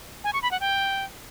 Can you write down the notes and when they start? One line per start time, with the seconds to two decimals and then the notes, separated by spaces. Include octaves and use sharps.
0.24 G#5
0.33 C#6
0.42 B5
0.51 F#5
0.60 G5